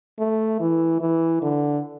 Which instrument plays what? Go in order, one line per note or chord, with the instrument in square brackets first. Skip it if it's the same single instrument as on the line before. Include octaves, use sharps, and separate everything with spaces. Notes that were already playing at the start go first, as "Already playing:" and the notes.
[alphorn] A3
E3
E3
D3